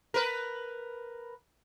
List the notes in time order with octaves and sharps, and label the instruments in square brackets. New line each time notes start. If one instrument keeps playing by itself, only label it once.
[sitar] A#4 B4